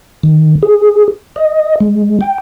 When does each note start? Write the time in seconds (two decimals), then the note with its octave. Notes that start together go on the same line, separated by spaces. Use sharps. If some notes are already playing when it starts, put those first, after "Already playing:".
0.23 D#3
0.63 G#4
1.36 D#5
1.80 G#3
2.21 G5